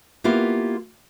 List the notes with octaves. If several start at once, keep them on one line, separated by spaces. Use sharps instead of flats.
A#3 B3 E4 F4 G4